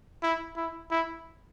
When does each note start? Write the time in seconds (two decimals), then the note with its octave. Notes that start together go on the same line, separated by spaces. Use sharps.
0.23 E4
0.56 E4
0.91 E4